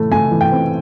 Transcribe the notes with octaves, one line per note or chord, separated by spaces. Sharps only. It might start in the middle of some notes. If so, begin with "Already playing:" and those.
Already playing: A2 E3 A3
A3 G#5
E3
G5
C4